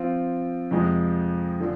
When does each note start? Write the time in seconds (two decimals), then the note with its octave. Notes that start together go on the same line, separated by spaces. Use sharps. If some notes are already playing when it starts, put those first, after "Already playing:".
Already playing: F3 C4 F4
0.71 F2 C3 F3 G#3
1.60 D3 F3